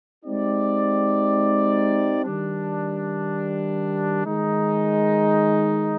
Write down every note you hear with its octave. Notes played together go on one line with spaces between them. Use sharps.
G#3 C4 D#4 G4 D5
D#3 G3 D4
D#3 G#3 D#4